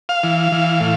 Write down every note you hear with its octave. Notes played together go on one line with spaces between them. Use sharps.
F5
E3
E3
A2